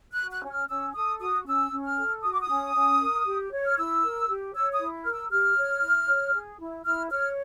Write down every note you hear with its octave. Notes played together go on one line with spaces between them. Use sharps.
F#6
F#4
F#6
C#4
F6
C#4 E6
A4 D#6
F#4 D#6
C#4 E6
C#4
F6
A4
F#4 D#6
D6
D#6
C#4
C#4
A#4
G4
C#5
F6
E4 E6
A#4
G4
C#5 E6
D#6
E4
A#4 F6
E6
G4 F6
C#5
E4
C#5
G#4
E4
E4 F6
C#5 F6